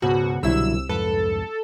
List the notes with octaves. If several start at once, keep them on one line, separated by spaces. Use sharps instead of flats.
C#2 G#2 B2 F#4
C2 B2 D3 F#3 G3 E4 E6
C2 F2 G#2 A4 B4